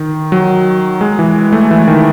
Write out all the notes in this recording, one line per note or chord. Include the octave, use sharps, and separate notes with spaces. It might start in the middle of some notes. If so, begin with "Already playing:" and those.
Already playing: D#3
F#3
G#3
E3
A3
E3
D#3